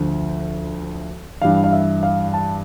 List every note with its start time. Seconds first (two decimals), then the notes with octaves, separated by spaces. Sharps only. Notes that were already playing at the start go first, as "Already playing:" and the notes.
Already playing: D2 D3 F3
1.42 G2 E3 G3 F5
1.64 F5
1.72 E5
2.03 F5
2.34 A5